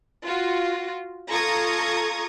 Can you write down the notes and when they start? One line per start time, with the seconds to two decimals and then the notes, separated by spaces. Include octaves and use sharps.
0.23 F4 F#4
1.30 F4 A4 A#5 C#6 D#6 G#6